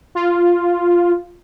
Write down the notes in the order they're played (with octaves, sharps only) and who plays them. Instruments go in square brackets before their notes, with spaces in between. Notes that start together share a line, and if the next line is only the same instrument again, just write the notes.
[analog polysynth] F4